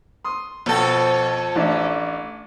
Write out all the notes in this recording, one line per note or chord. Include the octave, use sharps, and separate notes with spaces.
C6 D#6
F2 B2 A4
A1 D4 E5